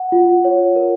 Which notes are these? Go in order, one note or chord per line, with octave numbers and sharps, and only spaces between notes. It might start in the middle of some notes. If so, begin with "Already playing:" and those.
Already playing: F#5
F4
C#5
A#4